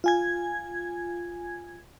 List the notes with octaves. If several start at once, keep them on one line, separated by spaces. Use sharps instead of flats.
F4 G#5 G#6